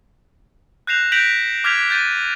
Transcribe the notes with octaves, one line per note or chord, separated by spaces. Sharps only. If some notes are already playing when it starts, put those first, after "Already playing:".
F#6 G6 A#6 C7 E7 F7
G6 A#6 B6 D7 F7 F#7
D6 F6 G6 G#6 B6 F7
G6 A6 D#7